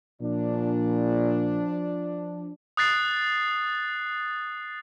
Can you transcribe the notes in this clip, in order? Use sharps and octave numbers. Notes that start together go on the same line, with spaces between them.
A#2 F3 D4
D#6 F#6 A6 C7